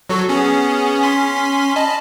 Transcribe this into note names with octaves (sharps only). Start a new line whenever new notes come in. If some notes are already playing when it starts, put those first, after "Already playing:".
F#3 F#4 A4
B3 C#4 G#4
C#4 C6 B6
D#5 A5 B5